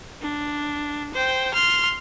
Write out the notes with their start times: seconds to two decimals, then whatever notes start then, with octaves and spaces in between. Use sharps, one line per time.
0.22 D4
1.14 C5 G5
1.54 C6 F6